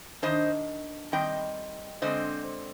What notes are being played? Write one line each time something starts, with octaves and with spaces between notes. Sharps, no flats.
D#3 G3 D4 C5 D#5
D#3 G3 C4 D#5 G5
D3 G#3 C4 C5 D#5